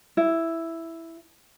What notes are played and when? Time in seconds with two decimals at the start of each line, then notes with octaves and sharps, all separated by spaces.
0.17 E4